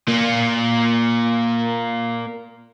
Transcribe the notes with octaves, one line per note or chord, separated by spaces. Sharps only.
A#3 F4